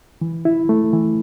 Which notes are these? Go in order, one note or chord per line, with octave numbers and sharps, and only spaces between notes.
E3
E4
A3
E3